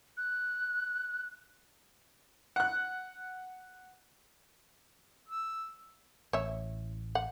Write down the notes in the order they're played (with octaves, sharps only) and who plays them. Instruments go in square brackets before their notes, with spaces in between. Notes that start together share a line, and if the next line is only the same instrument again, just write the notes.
[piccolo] F#6
[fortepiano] F#5 F#6
[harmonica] E6
[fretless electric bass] A1 [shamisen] C#5 E5
[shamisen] F#5